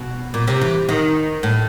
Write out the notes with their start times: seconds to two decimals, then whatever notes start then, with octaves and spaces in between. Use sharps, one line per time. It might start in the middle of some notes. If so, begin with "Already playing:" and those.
Already playing: B2
0.34 A#2
0.47 C3
0.61 E3
0.89 D#3
1.43 A2